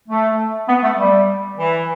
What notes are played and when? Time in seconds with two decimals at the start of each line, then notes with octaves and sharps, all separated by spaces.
0.09 A3
0.68 B3
0.83 A3
0.97 G3
1.58 E3